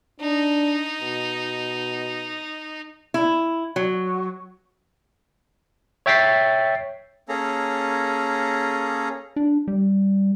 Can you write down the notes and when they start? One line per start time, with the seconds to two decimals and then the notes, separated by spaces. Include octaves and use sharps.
0.20 D4 D#4
1.01 B2
3.14 E4
3.76 F#3
6.06 C#5 E5 G5 A6 B6 C7
7.29 A#3 C#4 G#4 A4 A#5
9.36 D4
9.68 G3